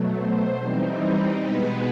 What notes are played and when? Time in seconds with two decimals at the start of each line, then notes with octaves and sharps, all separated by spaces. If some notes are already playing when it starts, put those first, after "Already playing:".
Already playing: B2 F#3 A3
0.17 C5
0.58 E3 G3 C4 D#4
1.42 B2 G#3 B3 B4